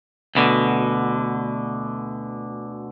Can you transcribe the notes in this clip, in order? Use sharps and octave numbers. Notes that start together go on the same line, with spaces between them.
D2 B2 D3